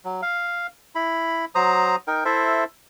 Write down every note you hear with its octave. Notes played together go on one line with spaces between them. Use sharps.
F#3
F5
E4 B5
F#3 C5 A#5 D#6
D#4 A#4 G5
E4 A4 C5 E5